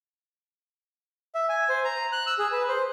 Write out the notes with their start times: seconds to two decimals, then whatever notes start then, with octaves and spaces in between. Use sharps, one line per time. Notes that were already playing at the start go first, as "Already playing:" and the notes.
1.35 E5
1.49 G#5
1.69 C5
1.85 A#5
2.12 F#6
2.27 E6
2.39 G#4
2.52 B4
2.68 C5